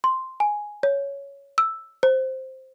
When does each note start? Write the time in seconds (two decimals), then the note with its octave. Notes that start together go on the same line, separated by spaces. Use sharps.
0.04 C6
0.40 G#5
0.83 C#5
1.58 E6
2.03 C5